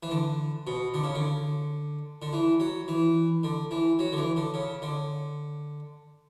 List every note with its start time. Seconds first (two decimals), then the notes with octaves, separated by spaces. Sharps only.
0.03 E3
0.11 D3
0.67 B2
0.94 D3
1.04 C#3
1.15 D3
2.22 D3
2.33 E3
2.60 F#3
2.88 E3
3.43 D3
3.71 E3
3.99 F#3
4.12 D3
4.17 E3
4.36 D3
4.54 C#3
4.82 D3